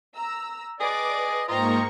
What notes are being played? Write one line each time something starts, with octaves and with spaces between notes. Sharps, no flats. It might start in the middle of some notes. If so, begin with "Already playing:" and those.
A#5 E6
G#4 B4 D5 D#5 D6
G#2 A#3 F4 C5 D#5 G5 A#5 C#6